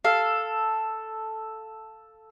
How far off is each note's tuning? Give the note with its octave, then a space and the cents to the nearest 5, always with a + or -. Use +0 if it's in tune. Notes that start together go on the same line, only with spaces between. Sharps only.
A4 +0 F5 +0